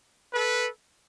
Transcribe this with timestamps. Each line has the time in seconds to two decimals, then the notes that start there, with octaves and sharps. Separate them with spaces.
0.33 A4 B4